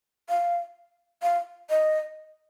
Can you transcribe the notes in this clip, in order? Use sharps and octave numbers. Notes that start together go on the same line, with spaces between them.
F5
F5
D#5